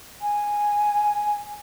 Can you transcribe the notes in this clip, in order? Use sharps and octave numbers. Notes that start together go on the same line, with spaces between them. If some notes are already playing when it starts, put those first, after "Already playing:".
G#5